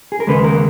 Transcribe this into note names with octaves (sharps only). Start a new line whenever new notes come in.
G#4
A#4
D#2 C#3 G#3 B4
A#4